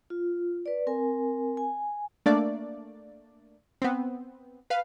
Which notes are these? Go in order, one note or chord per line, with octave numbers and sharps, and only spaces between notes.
F4
B4 D5
C4 A#4 G#5
G#5
A3 A#3 D4 D5
B3 C4
B4 F5